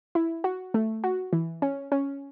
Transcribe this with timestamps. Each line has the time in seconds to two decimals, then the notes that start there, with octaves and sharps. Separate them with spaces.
0.15 E4
0.44 F#4
0.74 A3
1.04 F#4
1.33 E3
1.62 C#4
1.92 C#4